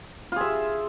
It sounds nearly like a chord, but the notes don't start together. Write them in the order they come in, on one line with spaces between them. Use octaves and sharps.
F4 G#4 E5